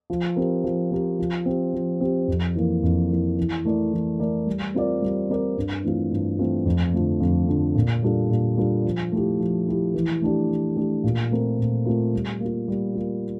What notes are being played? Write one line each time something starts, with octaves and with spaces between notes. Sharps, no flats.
F3
C4 G4 A#4
F3
C4 G4 A#4
F3
C4 G4
F3
C4 G4
F2
E3 A#3
F2
E3 A#3
E3
A3 E4 A#4 D5
E3
A3 E4 A#4 D5
G3
C4 F4 A#4 D5
G3
C4 F4 A#4 D5
G2
E3 A3 C4 F4
G2
E3 A3 C4 F4
F2
D3 F3 A3 C4
F2
D3 F3 A3 C4
A#2
G3 D4 F4 A4
A#2
G3 D4 F4 A4
F3
A3 E4 G4
F3
A3 E4 G4
E3
A3 D4 G4
E3
A3 D4 G4
A#2
A3 C4 F4 A#4
A#2
A3 C4 F4 A#4
G3
A#3 F4
G3
A#3 F4